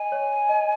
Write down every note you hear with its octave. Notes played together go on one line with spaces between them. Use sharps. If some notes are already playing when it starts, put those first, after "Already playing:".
Already playing: D#5 G#5
C#5
D#5